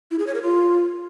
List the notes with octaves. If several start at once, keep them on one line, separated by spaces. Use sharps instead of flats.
E4
G#4
C#5
A#4
F4